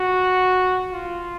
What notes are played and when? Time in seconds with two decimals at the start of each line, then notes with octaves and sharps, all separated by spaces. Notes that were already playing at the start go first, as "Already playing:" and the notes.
Already playing: F#4
0.93 F4